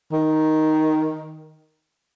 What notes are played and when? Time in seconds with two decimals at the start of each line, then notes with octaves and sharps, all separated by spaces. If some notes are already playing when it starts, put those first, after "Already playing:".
0.12 D#3